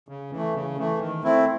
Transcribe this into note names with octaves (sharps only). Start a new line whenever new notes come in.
C#3
E3
A3
C#3
E3 A3
D#3
A3 C4 E4